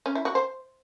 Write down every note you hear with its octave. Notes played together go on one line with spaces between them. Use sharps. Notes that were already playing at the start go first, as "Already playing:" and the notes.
C#4
E4
F#4
C5